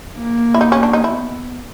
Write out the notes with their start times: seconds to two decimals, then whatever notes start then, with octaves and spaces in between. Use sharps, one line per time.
0.18 A#3
0.54 E4
0.61 D#4
0.72 C#4
0.83 D4
0.93 D#4
1.04 B3 E4